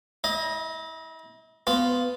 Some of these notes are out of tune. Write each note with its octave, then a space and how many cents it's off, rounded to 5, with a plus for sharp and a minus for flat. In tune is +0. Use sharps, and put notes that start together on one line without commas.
E4 -40 D#5 +0
B3 +15 F4 +0